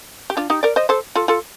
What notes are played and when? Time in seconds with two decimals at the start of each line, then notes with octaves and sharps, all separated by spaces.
0.30 G4
0.37 D4 F4
0.50 D#4 G4
0.63 A#4 D5
0.76 C5 D#5
0.89 A4 C5
1.16 F4 A4
1.28 F4 A4